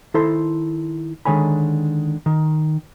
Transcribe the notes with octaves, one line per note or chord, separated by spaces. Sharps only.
D#3 E4 A4 C5 B5 C6
D3 D#3 G#3 C#5 G#5 B5
D#3